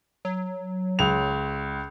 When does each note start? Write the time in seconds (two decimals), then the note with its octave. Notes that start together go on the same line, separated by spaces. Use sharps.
0.25 F#3
0.99 C#2 F7